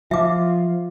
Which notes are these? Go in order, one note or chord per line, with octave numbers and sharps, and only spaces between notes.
F3 F4 E5 D6